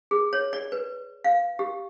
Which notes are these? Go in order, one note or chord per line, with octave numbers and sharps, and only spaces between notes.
G#4
C#5
D5
B4
F5
G4